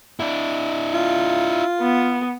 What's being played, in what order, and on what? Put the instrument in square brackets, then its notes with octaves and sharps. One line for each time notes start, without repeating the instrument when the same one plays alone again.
[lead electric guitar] D4 E4
[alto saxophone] F4
[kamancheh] B3